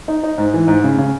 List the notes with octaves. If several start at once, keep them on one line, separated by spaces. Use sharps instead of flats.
D#4
D#4
G#2
E3
G#2
C#3
C#3